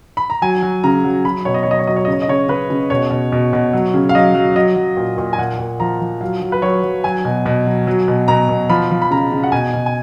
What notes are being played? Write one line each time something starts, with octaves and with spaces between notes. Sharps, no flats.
B5
A#5
F#3 G#5
F#3
C#3 A#5
F#3
F#3 B5
B2 C#5
D#5
C#5
F#3 D#5
C#5
F#3 D#5
C#5
C#3 D#5
C#5
D#5
C#3 C#5
C#3 B4
C#3
B2 C#5
B2
B2
B2
F#3
C#3
F5
F#3 D#5
F#3
F#3 D#5
F#3
A#2
A#2
G#5
A#2 F#5
A#2
F3 A#5
F3
F#3 F5
F#3
B4
F#3 C#5
F#3
F#3 G#5
B2
B2
F#3
F#3
B2
B2 A#5
B2
F3 B5
F3
B5
C#3 A#5
C#3
F#5
B2 G#5
B2
G#5